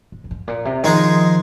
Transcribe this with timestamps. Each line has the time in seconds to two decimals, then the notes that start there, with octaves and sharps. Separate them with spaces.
0.12 G#2
0.24 F2
0.31 G#2
0.48 A#2
0.65 C3
0.83 D#3 F3 G#3 D#4 G#4